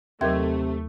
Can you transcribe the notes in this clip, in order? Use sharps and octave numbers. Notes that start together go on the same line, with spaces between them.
D#2 C3 F#3 A3 A#4 E5 C6 G#6